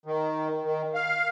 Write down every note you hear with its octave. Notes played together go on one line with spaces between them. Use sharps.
D#3
D#3
F5